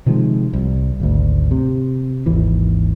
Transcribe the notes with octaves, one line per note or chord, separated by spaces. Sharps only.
C3 D#3 F3 G#3
C2
G#1 D2
C3
G#1 D#2 E3